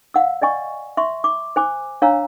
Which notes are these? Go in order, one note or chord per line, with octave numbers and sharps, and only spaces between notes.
F5 F#5 E6
D5 D#5 G#5 C#6
E5 C6 C#6
D6
C5 G#5 D6
D4 C#5 F5 G#5 A#5 E6